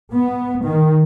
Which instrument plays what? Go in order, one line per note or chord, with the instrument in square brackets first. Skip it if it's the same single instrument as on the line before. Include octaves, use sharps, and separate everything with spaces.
[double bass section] B3
D#3